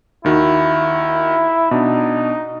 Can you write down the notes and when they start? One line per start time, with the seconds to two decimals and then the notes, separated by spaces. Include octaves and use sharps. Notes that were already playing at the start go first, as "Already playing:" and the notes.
0.24 D#2 D#3 E4 F#4
1.71 B2 D4 D#4